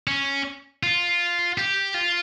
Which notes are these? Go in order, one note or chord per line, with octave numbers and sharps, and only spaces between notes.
C#4
F4
G4
F4